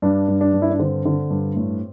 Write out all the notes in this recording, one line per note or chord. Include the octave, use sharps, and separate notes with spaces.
G2 D4
G2
D4
G2
E4
D4
D3 C4
D3
G2
A2